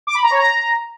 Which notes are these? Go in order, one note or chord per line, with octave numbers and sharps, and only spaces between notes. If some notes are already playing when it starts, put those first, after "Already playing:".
D6
B5
A#5
C#5
A#5